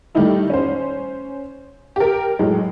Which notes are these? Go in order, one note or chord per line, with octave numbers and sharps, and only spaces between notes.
D#3 G3 A3 D#4 E4
C#4 C5
G4 A#4
A2 F#3 G#3